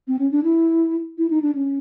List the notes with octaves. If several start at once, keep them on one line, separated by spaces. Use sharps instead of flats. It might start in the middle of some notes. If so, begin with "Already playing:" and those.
C4
C#4
D4
E4
E4
D#4
D4
C#4